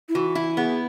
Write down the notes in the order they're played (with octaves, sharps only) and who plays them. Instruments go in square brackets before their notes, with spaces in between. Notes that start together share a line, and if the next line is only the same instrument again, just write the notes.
[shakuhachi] E4
[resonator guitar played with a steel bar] E3 [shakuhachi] F#4
[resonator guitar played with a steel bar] E4
[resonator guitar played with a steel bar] B3 [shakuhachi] G#4